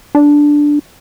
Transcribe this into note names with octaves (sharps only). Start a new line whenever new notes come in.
D4